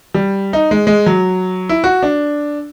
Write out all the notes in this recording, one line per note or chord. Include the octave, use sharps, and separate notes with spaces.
G3
D#4
G#3
G#3
F#3
E4
F#4
D4